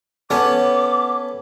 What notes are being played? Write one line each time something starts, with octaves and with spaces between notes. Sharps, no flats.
B3 C#4 A4 C#5 D6